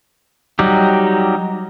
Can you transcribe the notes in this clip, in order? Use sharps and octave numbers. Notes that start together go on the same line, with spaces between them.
F#3 G3 D#4 G4